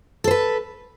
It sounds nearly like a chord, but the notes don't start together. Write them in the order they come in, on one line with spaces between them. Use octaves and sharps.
A4 C5 B4